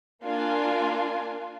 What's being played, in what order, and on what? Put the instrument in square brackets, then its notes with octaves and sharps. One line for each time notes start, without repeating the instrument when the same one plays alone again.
[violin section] A#3 D4 F4 G#5